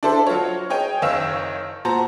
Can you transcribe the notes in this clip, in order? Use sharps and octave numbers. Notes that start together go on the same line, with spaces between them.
D4 E4 A4 C5
F#3 F4 F#4 C#5
D#4 G#4 C#5 G5 G#5
F#1 D#3 C#5 F5 E6 E7
A#2 F#4 C5 A5 A#5